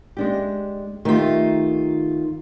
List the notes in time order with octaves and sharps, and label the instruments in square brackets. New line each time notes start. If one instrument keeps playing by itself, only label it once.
[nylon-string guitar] G#3 D4 G4
[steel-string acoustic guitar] D#3 F4 [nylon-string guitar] A3 G4